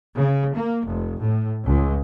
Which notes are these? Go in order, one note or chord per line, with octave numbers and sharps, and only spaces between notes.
C#3
A#3
F1
A2
C#2